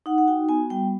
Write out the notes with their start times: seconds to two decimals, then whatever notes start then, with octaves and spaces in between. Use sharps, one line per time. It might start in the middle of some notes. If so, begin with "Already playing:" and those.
0.06 D#4 F#5
0.18 F#5
0.27 F#4 G5
0.49 B3 G#5
0.70 G3 G5